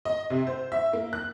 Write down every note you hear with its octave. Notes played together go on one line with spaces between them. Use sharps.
D#5
C3
C5
E5
A#3
F#6